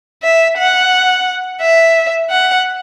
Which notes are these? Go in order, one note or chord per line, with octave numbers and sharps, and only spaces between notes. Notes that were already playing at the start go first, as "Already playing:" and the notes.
E5
F#5
E5
F#5